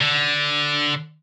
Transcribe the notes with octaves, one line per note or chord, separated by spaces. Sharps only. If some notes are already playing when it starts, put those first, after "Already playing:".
D3